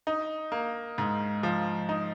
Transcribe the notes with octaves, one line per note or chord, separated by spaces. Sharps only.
D#4
A#3
G#2
F3
D#4